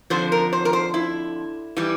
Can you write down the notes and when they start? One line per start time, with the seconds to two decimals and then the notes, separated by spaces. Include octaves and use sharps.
0.10 F2 D3 F3 C5
0.32 A#4
0.53 C5
0.65 A#4
0.73 C5
0.94 E4
1.77 E3 G3